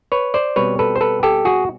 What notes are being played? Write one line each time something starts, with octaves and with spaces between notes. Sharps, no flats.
B4 C#5
C5 D5
B2 G3 C4 B4 C#5
A4 B4
C5
A4 B4
G4 A4
F#4 G#4